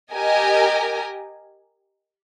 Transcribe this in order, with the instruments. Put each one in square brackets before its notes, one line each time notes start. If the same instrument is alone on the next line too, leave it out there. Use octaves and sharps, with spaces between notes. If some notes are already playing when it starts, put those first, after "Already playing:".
[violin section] G4 A#4 D#5 G#5